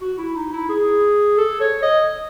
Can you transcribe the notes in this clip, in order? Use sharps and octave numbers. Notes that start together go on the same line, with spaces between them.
F#4
E4
D#4
E4
G#4
A4
C#5
D#5